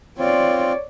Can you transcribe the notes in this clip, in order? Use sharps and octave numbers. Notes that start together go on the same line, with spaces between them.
C4 F4 C#5 D5